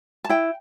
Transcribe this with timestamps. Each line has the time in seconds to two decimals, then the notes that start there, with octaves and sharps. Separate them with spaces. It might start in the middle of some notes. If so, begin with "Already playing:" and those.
0.24 A5
0.29 E4 G5